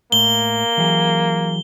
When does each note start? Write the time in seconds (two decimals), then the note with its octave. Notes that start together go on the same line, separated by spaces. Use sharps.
0.12 A2 A#3 G7
0.78 E3 F#3 G#4